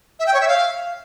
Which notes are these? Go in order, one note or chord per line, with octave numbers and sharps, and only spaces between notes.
E5
G5
C#5
E5
F5